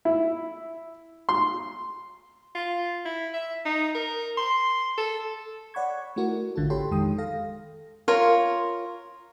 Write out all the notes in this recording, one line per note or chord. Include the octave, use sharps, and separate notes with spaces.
E4
C6
F4
E4
E5
D#4
A#4
C6
A4
C#5 D5 F#5 B5 C#6 G#6
A3 E4 F#4 A#4
A1 D3 F4 A4
G4 A4 C#5 G5 B5 C6
F2 D#3 G#3 G5 D#6
A4 F5 A#6
F4 A#4 C#5